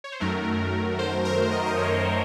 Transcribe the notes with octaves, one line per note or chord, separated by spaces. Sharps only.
C#5
C5
F#2 D#3 F#3 A3 A#4
C5
A#4
D#5
D#5
C#5
D#5